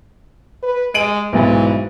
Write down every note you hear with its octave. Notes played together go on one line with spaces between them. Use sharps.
B4
G#3 D7 D#7 F#7
B1 G#2 E3